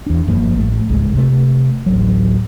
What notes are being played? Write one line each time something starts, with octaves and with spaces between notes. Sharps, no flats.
E2 D4
F#1 G2 F3 A#3
A1 A3
D1 G#1 C#2 G#3
C3 A3
D1 A1 F#3